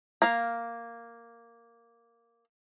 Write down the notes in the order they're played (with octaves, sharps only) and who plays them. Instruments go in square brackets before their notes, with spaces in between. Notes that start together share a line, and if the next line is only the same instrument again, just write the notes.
[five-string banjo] A#3 F5